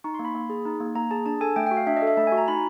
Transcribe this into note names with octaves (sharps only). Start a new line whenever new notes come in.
D#4 C#6
C6
A#3
B5
A#3
G#4
D#4
A#3
A#3 A#5
G#4 A5
D4 A5
A4 G#5
A3 G5
G5
F#4
F5
D4 E5
D#5
A4
E5
A3 A5
G#5
F#4
A#5
D#4 B5